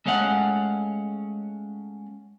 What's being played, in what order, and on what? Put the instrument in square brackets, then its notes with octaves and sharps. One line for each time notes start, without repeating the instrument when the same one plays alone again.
[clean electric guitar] G#3 A3 C#4 F5 F#5